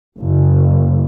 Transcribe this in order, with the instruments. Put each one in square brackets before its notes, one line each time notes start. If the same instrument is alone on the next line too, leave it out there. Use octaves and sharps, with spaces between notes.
[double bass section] F#1